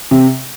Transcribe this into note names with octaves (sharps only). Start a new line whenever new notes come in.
C3